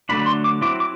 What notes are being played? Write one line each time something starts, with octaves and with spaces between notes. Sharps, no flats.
D3 F#3 A3 D4 B5
B5
C6
D6
F#3 C4 E4 D6
D6